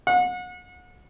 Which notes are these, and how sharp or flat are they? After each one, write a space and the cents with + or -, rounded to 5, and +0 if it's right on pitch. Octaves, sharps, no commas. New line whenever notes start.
F#5 -35